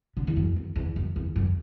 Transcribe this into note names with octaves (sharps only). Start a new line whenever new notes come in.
D3
E2
F#2
E2
E2
F#2
E2
F#2